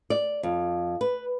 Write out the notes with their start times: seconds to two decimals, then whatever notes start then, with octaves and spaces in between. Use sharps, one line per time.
0.10 D5
0.43 F2
1.01 B4